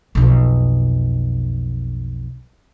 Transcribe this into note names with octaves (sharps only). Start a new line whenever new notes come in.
B1 F2